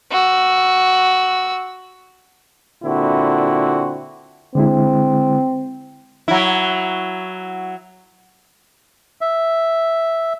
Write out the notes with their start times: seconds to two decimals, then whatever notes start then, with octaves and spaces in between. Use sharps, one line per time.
0.11 F#4 E6
2.83 A#2 D3 C4 E4 F#4
4.55 D3 G#3 C4 E4
6.28 F#3 E4
9.21 E5